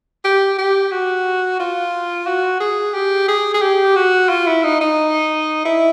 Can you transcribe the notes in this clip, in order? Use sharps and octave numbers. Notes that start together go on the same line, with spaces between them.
G4
G4
F#4
F4
F#4
G#4
G4
G#4
G#4
G4
F#4
F4
E4
D#4
D#4
E4